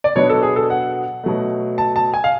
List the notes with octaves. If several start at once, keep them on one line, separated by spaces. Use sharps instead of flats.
D5
B2 F#3 B3 D4 C#5
A4
G#4
A4
F#5
B2 F#3 A3
A5
A5
G#5
F5